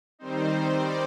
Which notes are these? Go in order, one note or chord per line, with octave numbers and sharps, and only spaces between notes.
D#3 G3 C4 D#4 C5
C5
D5